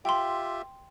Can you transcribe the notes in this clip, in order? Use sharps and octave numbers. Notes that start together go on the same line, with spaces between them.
F4 G4 E5 G5 C6